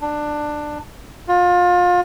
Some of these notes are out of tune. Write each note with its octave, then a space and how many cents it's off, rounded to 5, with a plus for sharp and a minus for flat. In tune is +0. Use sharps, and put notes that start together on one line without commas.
D4 +15
F4 +30